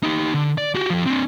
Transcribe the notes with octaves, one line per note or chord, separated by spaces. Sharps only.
D#4 G4
D3
D5
F#4 G4
F3 A4
C4 D4